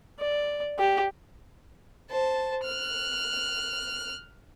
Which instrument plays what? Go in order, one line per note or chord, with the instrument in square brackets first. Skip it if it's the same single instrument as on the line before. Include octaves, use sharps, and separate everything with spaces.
[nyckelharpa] D5
G4
[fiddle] C5 A5
F6 F#6